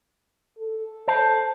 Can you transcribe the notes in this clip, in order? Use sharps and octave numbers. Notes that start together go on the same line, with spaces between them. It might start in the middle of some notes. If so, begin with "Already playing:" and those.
A4
C5 A5